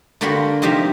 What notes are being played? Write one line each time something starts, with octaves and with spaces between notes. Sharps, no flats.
D3 A#3 F#4 G4 B5 C6
C3 F3 D#4 G4 E5 F5